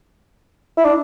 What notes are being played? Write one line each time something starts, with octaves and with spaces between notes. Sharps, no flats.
E4
D4